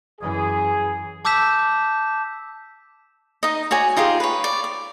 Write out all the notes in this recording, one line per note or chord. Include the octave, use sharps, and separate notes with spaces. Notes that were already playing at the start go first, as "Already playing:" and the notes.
F#2 E3 G#4
A5 D6 E6 G6 B6 E7
D#4 D#5
F#4 C#5 D5 G#5
D#4 F4 G4 G#4
B4 C#5
D5
D6